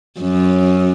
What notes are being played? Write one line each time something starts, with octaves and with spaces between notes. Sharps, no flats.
F#2